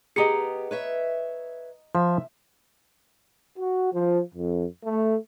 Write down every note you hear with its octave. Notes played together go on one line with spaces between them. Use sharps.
B3 G4 G#4 D#5 A#5 C#7
B4 C#5 E5
F3 E5
F#4
F3
F2
A3